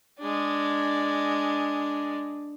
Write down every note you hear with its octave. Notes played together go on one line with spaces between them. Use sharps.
G#3 D4